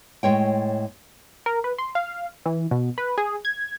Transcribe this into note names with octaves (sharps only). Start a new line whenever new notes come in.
A2 G#3 C#5 G5
A#4
B4
C6
F5
E3
B2
B4
G#4
G#6